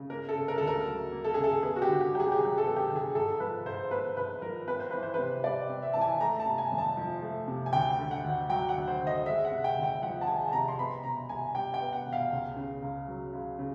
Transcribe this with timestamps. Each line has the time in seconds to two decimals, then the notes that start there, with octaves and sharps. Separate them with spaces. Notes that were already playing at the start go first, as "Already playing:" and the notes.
Already playing: C#3
0.10 A#3 A#4
0.29 A4
0.35 C#3
0.48 A#4
0.58 D2 A4
0.67 A#4
0.86 F#3
1.12 A#3
1.24 A4
1.34 C#3 G#4
1.44 A4
1.63 B3 G#4
1.76 F#4
1.82 G4
1.88 D3
2.00 G4
2.13 F#2 G4
2.20 G#4
2.32 G4
2.39 F#3 G#4
2.58 A4
2.64 B3
2.77 G4
2.89 D3
2.96 G#4
3.15 G#2 A4
3.40 F3 B4
3.66 G#2 C5
3.91 A#3 B4
4.17 G#2 B4
4.42 F3 A#4
4.68 C4 B4
4.79 C5
4.91 E3 B4
5.03 C5
5.14 C3 B4
5.44 G3 D5
5.69 C4
5.82 E5
5.93 E3 A5
6.01 G#5
6.20 A3 A#5
6.40 A5
6.46 C3
6.58 G#5
6.72 F2
6.78 A5
6.97 F3
7.22 A3
7.48 C3
7.66 G#5
7.73 D2 G5
7.99 D3
8.11 F#5
8.24 D2
8.49 F#3 G5
8.69 F#5
8.75 D2
8.88 C5
9.00 D3
9.07 D#5
9.26 G#3 E5
9.45 F#5
9.52 C3
9.64 G5
9.77 D2
9.83 G5
10.02 F3 F#5
10.21 A5
10.27 G#3 G#5
10.48 A5
10.53 C3 A#5
10.68 C6
10.78 B3 B5
11.03 B2 A#5
11.29 C2 G#5
11.55 G3 G5
11.74 G5
11.80 B3
11.93 F#5
12.06 B2
12.13 F5
12.31 C#2
12.56 C#3
12.82 C#2
13.08 F#3
13.33 C#2
13.59 C#3